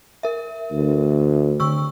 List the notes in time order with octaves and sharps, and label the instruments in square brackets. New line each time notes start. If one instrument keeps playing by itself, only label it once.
[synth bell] A#4 E5
[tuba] D2
[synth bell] D3 C#6 E6